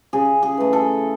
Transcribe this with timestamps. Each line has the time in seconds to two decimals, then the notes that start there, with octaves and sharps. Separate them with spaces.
0.13 C#3 G#4
0.43 G#4
0.57 E3 A3
0.73 A4